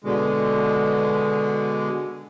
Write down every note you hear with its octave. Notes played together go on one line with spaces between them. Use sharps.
B2 D3 G#3